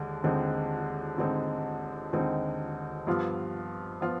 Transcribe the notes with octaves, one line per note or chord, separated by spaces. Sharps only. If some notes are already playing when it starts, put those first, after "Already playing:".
Already playing: D#2 D3 G#3
D#2 D3 G#3 C4 D#4
D#2 D3 G#3 C4 D#4
D#2 D3 G#3 C4 D#4
G2 F3 B3 F4
F3 B3 F4